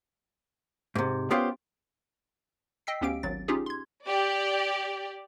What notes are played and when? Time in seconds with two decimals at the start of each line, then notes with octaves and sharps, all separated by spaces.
0.95 G#2 C3
1.31 B3 C#4 F4 G4 B4 C5
2.87 D#5 G5 E6 B6 C7
3.01 D2 B3 C#4 G4 F5 D7
3.23 G#1 F#3 A6
3.48 C#4 D#4 F4 G4 G#4
3.66 C6 G#6
4.06 G4 D5